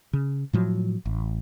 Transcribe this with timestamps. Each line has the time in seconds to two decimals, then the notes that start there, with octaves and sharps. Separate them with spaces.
0.13 C#3
0.53 A2 F3 F#3
1.06 A1